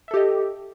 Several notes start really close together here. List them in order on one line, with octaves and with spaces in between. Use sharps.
E5 A4 G4 D#5